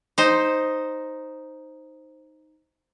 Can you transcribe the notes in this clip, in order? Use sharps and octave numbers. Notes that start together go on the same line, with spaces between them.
D#4 C5